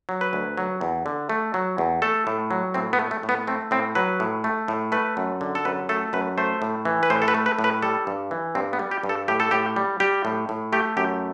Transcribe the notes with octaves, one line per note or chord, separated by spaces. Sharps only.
F#3
B4
D2
F#3
E2
D3
A3
F#3
E2
A3 A4
A2
F#3
A2 C4
B3
A3
A3
A2
B3
A3 C4
A2 C4
F#3 B4
A2
A3
A2
A3 B4
F#2
D3
A4
F#2 B4
A3 A4
F#2 B4
A3 C5
A2
E3
B4
A2 C5
A4
B4
A3
B4
A2
B4
G3 A4
G2
E3
G2 C4
B3
G3
G4
G2
A4
A2 G4
A4
A2 G4
G3
G3 G4
A2
A2
A3 G4
F#2 G4